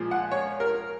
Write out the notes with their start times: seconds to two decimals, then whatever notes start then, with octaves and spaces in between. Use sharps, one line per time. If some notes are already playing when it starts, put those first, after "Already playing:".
Already playing: A#2 F3 G#3
0.11 F#5
0.32 C#5
0.60 A#4